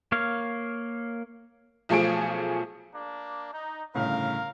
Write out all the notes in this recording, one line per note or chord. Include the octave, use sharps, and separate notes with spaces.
A#3 C#5 F5
B1 F3 A3 G#4 D7
A#3 D4
D#4
G1 A2 C#3 A#4 F5